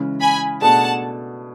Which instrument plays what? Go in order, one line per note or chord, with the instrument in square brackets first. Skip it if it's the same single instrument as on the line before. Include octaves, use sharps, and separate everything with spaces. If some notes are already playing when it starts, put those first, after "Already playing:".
Already playing: [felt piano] C#3 E3 G#3 C#4
[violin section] G#5 B5
[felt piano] B2 A3 D4 G#4 [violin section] F#5 A5